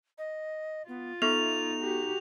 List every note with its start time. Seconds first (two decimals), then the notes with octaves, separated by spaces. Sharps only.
0.18 D#5
0.88 B3 F4
1.22 B3 D#4 A4 C#6 F7
1.79 F#4 G4